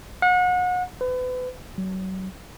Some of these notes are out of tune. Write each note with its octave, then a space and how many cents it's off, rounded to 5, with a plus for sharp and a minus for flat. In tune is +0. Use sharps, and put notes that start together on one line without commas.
F#5 -35
B4 +35
F#3 +30